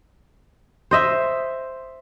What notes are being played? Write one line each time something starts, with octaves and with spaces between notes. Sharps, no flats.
C5 D#5 E5